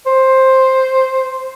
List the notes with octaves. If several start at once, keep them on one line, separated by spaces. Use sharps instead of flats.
C5